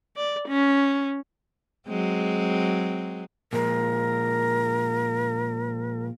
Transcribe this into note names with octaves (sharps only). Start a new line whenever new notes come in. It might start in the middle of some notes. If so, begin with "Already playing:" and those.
D5
C#4
F#3 G#3 C4
A#2 F3 G#3 A#4